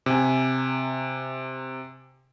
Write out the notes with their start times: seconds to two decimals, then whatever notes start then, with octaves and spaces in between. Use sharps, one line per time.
0.06 C3 G#5